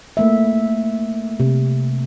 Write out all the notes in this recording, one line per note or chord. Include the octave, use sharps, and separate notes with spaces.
A3 A#3 E5
C3